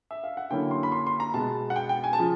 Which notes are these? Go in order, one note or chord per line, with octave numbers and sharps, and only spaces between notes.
E5
F5
F#5
D3 F#3 A#3 C#4 E4 G5
C6
B5
C6
C6
A#5
B2 G#3 B3 A5
F#5
G5
G5
G#5
A5
C#3 F3